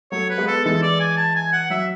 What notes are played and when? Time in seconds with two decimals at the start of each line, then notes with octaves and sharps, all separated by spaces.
0.12 F#3 A3 C#5
0.30 B4
0.38 G#3 B3
0.47 A4
0.65 E3 G#3 A4
0.82 D5
1.00 G#5
1.17 A5
1.35 G#5
1.53 F#5
1.70 F#3 E5